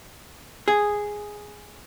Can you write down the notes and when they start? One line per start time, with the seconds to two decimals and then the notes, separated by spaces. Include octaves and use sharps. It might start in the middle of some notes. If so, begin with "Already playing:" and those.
0.68 G#4